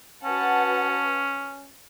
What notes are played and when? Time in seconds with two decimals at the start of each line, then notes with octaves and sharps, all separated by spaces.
0.24 C#4 F#4 B4 F#5 A5